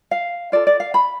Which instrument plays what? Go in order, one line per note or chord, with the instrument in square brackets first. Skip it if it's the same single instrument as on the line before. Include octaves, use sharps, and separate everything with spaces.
[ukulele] F5
F4 A4 D5
D5
F5
B5